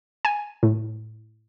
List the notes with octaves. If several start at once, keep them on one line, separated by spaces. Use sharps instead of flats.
G#5
A2